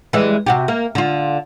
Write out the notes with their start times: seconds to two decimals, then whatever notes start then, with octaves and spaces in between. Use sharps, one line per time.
0.13 E3 G3 G#3
0.46 C3 F#4 G4
0.68 A#3
0.95 D3 F4